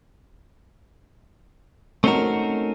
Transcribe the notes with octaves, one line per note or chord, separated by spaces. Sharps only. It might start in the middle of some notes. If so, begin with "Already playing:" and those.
A3 C4 C#4 D#4 F#4 A#4